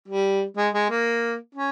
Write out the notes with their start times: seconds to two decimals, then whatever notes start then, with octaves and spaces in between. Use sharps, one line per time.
0.08 G3
0.57 G#3
0.74 G#3
0.90 A#3
1.55 C#4